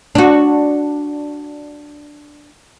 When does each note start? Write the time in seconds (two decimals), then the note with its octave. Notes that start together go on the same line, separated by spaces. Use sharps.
0.15 D4 F#4